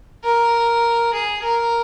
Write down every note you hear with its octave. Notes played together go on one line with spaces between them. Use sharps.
A#4
G#4
A#4